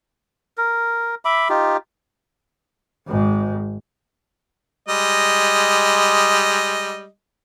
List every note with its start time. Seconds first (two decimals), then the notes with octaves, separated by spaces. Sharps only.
0.58 A#4
1.25 E5 B5 D6
1.49 D#4 F4 G4
3.08 G#1 G#2
4.88 G3 G#3 D#5